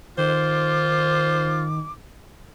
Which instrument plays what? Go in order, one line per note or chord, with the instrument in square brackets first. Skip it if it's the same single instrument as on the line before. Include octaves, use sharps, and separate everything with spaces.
[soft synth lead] D#3 [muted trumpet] F4 [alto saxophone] C5 [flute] D6